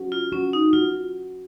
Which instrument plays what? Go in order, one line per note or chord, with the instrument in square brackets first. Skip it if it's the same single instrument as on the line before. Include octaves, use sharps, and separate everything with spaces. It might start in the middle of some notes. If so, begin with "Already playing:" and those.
Already playing: [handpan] C#4 F#4
[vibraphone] F4
[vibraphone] C#4 [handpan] F#4
[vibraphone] D#4
[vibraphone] F4 [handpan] F#4